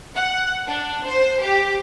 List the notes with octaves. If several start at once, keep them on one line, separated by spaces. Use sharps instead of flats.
F#5
D4
C5
G4